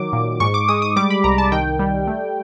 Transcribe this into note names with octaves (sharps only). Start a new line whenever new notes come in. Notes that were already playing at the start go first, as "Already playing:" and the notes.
Already playing: D#3 F#3 D6
A#2
G#2 C#6
D6
G#3 D#6
D#6
G3 D6
B5
C2 A#5
A5
D#3 G5
G3
A3